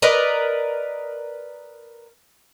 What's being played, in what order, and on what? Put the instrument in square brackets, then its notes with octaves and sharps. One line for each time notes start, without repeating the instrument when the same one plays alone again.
[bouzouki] A#4 B4 D5 D#5